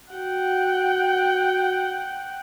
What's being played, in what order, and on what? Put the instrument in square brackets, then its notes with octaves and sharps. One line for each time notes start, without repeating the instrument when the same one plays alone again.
[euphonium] F#4 [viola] F#5 G5